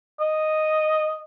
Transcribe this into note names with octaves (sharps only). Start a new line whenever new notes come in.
D#5